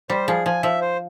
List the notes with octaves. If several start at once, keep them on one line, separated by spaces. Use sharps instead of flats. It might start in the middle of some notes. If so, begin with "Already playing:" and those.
G3 C5
F3 G#4
F3 G#5
F3 E5
C5